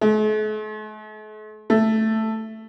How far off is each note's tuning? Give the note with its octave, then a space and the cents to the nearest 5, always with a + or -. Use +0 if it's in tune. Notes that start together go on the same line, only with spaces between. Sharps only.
A3 -45
A3 +5